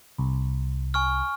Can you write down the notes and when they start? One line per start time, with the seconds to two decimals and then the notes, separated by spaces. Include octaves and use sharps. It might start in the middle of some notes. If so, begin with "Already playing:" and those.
0.18 C2
0.94 G#5 C#6 F6